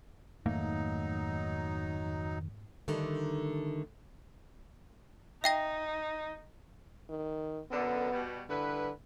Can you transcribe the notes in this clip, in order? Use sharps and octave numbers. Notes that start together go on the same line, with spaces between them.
F2 G#2 D#3 F#3 A3 A#3 D#4
D3 D#3 G3 A3 D4 D#4
D#4 E5 G5 A#6
D#3
F#2 D3 B3
B2 G3
G2 D3 E4 B4